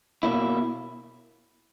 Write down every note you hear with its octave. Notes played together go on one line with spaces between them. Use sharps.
B2 A#3 E4